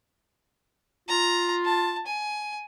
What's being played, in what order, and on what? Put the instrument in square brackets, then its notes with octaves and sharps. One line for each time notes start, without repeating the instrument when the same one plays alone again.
[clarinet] F4 [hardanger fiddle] A#5
[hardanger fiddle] A5
G#5